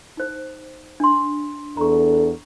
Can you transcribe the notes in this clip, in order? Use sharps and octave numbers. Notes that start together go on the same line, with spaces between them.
D#4 C5
D4 C6
E2 D4 A4 A#5 C#6